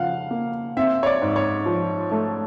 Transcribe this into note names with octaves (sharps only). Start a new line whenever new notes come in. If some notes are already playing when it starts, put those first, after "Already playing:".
Already playing: C#3 F3 F5 F#5
A#3
C4 E5
C#5
D5
G#2
C#5
F3
A3